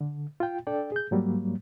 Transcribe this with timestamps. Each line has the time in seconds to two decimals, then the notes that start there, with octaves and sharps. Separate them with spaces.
0.01 D3
0.40 F4 G5
0.67 D4 A4 D5 G5
0.92 G#4 G6
1.11 G#2 F#3 G3 A#3